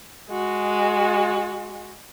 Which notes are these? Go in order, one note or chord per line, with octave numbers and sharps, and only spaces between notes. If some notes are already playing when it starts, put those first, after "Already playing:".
G#3 F#4